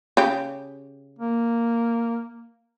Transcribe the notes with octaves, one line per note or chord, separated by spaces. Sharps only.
C#3 G4
A#3